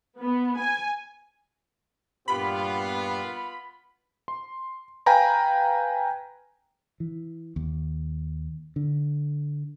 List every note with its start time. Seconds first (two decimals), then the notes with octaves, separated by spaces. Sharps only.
0.21 B3
0.59 G#5
2.28 G2 A#2 B3 F4 G4 B5
4.28 C6
5.06 B4 F5 G5 G#5 A#5 B5
7.00 E3
7.56 D#2
8.76 D3